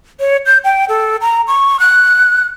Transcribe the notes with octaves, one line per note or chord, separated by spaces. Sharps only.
C#5
G6
G5
A4
A#5
C#6
F#6